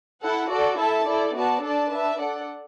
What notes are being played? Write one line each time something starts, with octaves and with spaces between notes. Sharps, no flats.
E4 A4 F#5
F#4 A4 D5
E4 A4 E5 A5
E4 A4 D5
B3 F#4 D5 A5
D4 A4 D5 A5
D4 B4 E5 A5
D4 A4 D5 F#5